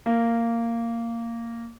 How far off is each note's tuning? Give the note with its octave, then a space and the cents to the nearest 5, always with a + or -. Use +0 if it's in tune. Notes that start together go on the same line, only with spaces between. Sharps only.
A#3 -10